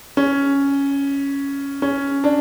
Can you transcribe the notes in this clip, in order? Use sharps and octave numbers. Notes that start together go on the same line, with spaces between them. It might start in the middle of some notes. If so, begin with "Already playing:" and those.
C#4
C#4
D4